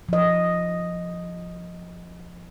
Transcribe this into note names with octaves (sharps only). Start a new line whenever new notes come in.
F3 D#5